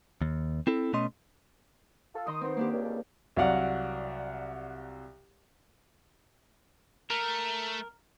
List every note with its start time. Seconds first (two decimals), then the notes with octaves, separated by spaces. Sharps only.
0.22 D#2
0.67 C4 E4 A4
0.93 B2 A3 C#4 D#5 C6
2.15 F4 A4
2.27 D#3 C6 D#6
2.41 B3 C4 D#4 C5
2.57 A#3 D4 G4
2.71 C#2 G2
3.36 C2 F#3 D5 F5 F#5
7.10 A3 A#4